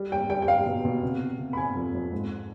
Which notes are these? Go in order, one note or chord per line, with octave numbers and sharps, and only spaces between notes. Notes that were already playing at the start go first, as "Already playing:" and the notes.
Already playing: G3
G3 G5
G3 G5
G5
G3 F5
B2
B2
C3
C3
C3
B5
C3 G#5
F2
F2
G#2